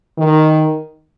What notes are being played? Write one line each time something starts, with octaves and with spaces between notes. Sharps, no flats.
D#3